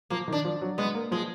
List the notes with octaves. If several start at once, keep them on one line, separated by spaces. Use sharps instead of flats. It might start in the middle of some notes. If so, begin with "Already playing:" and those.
F3 A#3
D#3
D4
F3
F#3
G#3 B3
A#3
F3 G#3